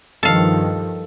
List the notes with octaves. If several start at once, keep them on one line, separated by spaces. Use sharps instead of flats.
G2 D#3 F3 A4 F5